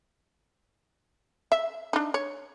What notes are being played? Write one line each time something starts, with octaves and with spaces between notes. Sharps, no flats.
E5
D4 D#4
C#5